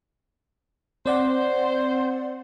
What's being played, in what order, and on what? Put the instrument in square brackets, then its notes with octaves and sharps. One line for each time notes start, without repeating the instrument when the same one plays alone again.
[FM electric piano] C4 D5 F#5 [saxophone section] C5